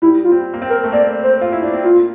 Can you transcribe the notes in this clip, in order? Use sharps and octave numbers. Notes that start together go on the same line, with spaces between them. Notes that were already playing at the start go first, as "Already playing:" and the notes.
G3 E4
F4
C4
A#3
C4
A#4
A3
A#3 D5
C5
F4
E4
D4
C4
A#3 F4